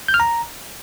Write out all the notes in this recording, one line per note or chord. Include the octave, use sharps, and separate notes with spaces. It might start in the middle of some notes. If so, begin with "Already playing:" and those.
G6
F6
A#5